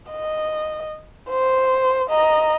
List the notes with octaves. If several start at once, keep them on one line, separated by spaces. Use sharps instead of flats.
D#5
C5
D#5 A#5